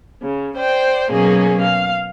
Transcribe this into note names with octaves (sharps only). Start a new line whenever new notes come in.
C#3
C5 D5 G5
B2 F#3 A#3 C#4 G#4
F5